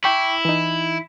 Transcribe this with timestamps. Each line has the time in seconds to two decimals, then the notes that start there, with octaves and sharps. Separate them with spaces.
0.04 E4 G5 C#6 D6
0.45 E3 D#4